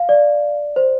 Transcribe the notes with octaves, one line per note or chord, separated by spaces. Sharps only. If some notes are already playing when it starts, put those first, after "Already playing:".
Already playing: F5
D5
C5